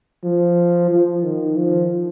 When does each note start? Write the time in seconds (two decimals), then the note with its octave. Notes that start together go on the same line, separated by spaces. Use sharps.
0.24 F3
0.90 F3
1.23 D#3
1.56 F3